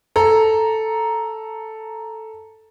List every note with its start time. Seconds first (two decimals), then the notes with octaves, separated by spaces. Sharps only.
0.16 A4 A#5